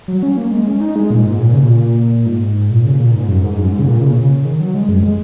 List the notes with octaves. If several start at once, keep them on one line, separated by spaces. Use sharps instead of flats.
F#3
C#4
A#3
G#3
C#4
D#4
G#3
A#2
G#2
A#2
C#3
A#2
G#2
A#2
C#3
C#3
A#2
G#2
F#2
G#2
F#2
G#2
C#3
A#2
C#3
A#2
C#3
D#3
F#3
G#3
F#2
G#3